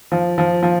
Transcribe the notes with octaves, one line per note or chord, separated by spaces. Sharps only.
F3
F3
F3